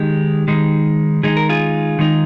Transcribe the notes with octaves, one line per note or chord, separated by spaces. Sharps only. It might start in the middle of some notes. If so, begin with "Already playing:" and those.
Already playing: D#3 G#3 D#4 G4
D#3 G#3 D#4
D#3 G#3 D#4 G#4
A#4
F4 G#4
D#3 G#3 D#4